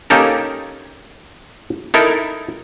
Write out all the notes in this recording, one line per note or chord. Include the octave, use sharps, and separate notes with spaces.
A#3 C#4 D#4 G4 A4 A#4
D#4 E4 A4 A#4